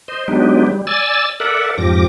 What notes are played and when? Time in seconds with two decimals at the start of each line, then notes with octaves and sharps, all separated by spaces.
0.08 C5 D#5
0.28 F#3 G#3 B3 D4 D#4 G4
0.67 G3
0.87 D5 G#5 E6 A6
1.40 A4 A#4 D5 E5 F#5
1.78 F2 G#2 F3 G4 D6 A#6